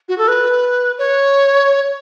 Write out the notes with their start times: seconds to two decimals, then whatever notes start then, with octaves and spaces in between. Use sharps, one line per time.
0.09 F#4
0.18 A4
0.28 B4
0.98 C#5